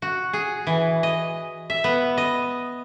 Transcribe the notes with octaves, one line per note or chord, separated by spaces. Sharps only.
F#4
G#4
E3
D#5
E5
B3
D#5